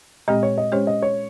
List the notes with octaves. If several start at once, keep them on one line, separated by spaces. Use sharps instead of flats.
A#2 G#3 C4 G4 D#5
C#5
D#5
G#3 C#4 G4 C5 C#5
D#5
C#5